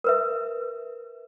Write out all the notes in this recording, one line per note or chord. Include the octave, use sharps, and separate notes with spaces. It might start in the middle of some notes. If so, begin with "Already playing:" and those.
A#4 B4 E5